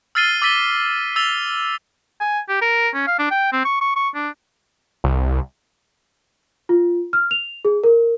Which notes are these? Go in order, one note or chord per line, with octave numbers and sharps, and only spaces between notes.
E6 F6 A6 C7 D#7 G7
D6 E6 A6 B6 D#7 G7
E6 A6 F7 G7
G#5
G4
A#4
C#4
F5
D4
G5
C4
C#6
C#6
C#6
D4
C2
F4
F6
F7
G#4
A#4